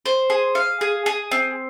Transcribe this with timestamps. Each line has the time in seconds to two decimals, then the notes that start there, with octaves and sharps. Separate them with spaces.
0.06 C5
0.30 G#4
0.55 F5
0.81 G#4
1.06 G#4
1.31 C4